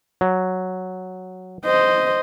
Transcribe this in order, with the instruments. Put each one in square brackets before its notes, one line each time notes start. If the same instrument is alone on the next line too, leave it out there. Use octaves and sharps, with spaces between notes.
[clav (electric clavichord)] F#3
[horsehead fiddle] C5 D#5